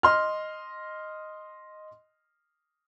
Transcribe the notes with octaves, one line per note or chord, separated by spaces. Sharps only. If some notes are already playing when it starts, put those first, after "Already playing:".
D#5 C6 F6